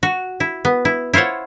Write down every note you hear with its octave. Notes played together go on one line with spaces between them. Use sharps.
F#4
E4
B3
E4
E4 F4 C5 C#5 F#5